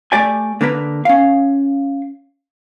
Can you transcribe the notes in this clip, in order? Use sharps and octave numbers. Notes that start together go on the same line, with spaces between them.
A3 G4 D5 G#5
D3 A#3 A#4 B4
C#4 F5